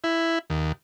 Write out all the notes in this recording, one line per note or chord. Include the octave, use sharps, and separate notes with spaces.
E4
D#2